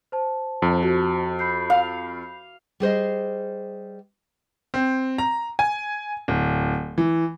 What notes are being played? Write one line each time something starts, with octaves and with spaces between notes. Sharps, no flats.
C5 A5
F2
F#4
B5 G6 C7
F5
G3 G#4 C5 D#5
C4
A#5
G#5
D1
E3